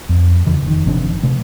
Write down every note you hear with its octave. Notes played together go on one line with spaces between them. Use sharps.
F2
E2 C#3 E3
F1 D#3
G1 C3 F3 D4
C3 A3